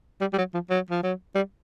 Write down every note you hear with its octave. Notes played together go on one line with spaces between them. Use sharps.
G3
G3
F#3
F3
F#3
F3
F#3
G3